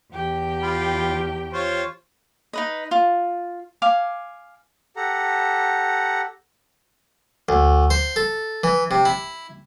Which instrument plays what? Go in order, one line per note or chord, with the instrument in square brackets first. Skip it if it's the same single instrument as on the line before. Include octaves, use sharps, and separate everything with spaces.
[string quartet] E2 G4 G5
[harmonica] F4 B5
F4 C5 C#5
[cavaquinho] D#4 B4 D#5
F4
F5 G#5 D6
[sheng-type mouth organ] G4 A4 F#5 A#5
[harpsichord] D2
C5
A4
E3
C3
E4